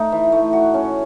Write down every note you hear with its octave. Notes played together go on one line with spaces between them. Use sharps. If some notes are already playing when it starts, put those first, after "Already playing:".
Already playing: A3 D#4
E3
A3
F#4
C#4